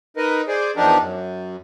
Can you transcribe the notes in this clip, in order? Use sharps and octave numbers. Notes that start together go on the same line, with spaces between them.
D#4 A#4 B4 D#5
G#4 C5 D5
E2 F3 D4 D#4 G4 A#4
F#2